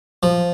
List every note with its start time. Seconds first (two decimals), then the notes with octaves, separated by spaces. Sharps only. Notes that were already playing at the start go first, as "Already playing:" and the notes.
0.23 F3